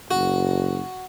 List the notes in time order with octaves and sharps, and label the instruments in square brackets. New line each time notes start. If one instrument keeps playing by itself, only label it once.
[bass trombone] F#1 [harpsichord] F#4